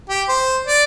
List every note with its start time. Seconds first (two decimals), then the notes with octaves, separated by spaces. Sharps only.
0.09 G4
0.29 C5
0.67 D5